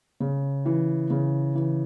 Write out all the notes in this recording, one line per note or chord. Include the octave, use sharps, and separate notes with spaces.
C#3
E3
C#3
E3